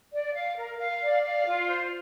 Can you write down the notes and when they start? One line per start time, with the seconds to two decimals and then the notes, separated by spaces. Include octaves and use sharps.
0.12 D5
0.33 F5
0.56 A#4
0.78 F5
1.00 D5
1.22 F5
1.46 F4
1.67 C5